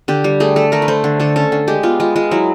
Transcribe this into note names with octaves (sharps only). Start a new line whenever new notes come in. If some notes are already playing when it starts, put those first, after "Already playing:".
D3 G4
G3
A3 G#4
A3 A4
A3 A#4
B4
A3 C5
D3
D3 A4
C#4 A4
D3
G#3 G4
B3 F4
G#3 F4
G#3 F4
F#3 E4